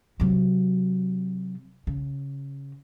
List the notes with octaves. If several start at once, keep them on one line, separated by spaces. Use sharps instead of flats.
C3 F#3
C#3